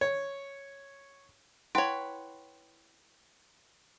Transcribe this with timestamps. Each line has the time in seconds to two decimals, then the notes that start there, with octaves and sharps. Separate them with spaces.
0.01 C#5
1.75 E4 B4 C#5 F#5 G5 C6